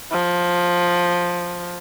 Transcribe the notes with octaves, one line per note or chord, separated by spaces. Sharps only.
F3